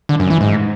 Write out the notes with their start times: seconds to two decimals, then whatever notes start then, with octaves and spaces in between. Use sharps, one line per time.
0.09 D3
0.20 F#2
0.30 E3
0.41 G#2